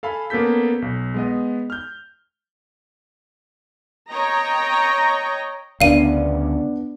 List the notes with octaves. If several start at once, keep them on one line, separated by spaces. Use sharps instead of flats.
A4 F5 G#5 B5
A#3 B3 C#4 A4 G6 B6
B1
G#3 B3 D#5
F6 G6
C#5 D#5 G5 A#5
D2 C#3 B3 D4 F5 D#7